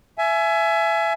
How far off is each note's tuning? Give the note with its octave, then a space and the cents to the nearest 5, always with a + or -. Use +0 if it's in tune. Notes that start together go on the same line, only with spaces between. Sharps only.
E5 +20 G#5 +25